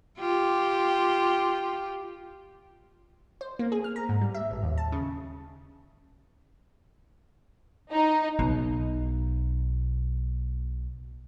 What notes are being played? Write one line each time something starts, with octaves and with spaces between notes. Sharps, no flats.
F4 G4
C5
A#3
G#4
F6
A#5
G#2
G3
E5
A1
D#2
A5
C#3
D#4
B1 B2